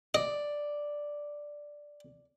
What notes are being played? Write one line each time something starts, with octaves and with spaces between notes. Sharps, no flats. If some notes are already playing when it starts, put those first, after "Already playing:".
D5 D#5